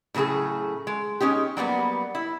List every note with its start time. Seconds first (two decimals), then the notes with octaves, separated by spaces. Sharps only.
0.14 A2 C#3 F#3 A3 G#4
0.87 G#3
1.20 G#3 C#4 D#4 G4
1.57 F#3 G3 A#3 B3
2.15 E4